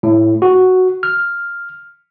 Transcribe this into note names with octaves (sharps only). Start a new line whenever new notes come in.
A2
F#4
F6